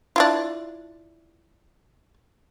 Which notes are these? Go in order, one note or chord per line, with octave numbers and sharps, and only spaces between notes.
D4 E4 F4